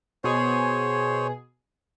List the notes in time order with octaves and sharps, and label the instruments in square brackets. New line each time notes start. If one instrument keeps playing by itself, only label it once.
[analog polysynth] B2 G#4 [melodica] C5 C#5